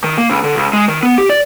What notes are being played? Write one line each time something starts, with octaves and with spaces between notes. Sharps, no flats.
D#3
A#3
C#2
D3
C#2
G#3
D#3
B3
G4
D5